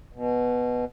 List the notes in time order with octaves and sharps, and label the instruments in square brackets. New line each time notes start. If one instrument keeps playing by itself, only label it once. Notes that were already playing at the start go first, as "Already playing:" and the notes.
[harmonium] B2